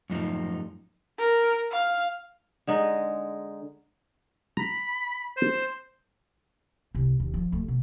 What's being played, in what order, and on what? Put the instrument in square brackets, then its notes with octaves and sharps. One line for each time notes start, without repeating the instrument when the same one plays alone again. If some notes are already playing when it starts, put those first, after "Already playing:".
[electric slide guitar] F#2 A2 F3 D#4
[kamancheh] A#4
F5
[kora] D3 G#3 D#4
[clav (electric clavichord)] A#5 [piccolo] B5
[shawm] C5 [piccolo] E7
[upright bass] C2
D#2
F3
D2
B2